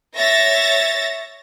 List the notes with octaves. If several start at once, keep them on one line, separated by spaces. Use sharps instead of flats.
C#5 E5 A6 A#6